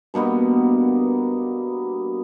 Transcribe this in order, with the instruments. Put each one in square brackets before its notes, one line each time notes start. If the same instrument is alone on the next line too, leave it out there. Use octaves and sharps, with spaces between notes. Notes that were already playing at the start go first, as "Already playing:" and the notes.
[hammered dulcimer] G2 B2 A#3 B3